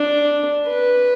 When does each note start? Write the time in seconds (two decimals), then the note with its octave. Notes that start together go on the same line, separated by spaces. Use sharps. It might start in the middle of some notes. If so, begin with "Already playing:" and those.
Already playing: D4
0.68 B4